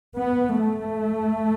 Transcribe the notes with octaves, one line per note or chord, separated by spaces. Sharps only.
B3
A3